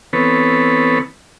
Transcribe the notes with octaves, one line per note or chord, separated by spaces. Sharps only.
E3 B3 C4 A4 B4 C#5